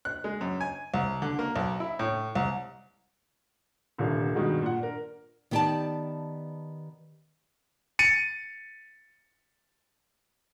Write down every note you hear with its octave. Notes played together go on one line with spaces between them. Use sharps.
F#6
G#3
F#2
G#5
C2
D3
A#3
B1
E4
A2
C2
D#1 C2 D3
G2 B2 D#3 G#3 F#4
A#2 F#5
D4 A#4
D#3 B3 G4 G#4 D5 A5
A6 C#7 D#7